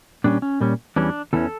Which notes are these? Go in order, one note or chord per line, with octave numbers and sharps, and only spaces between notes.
A#2 G3 C#4 D4
C#4
A#2 G3 C#4
E2 E3 G3 C#4 D4
E2 E3 C#4 A4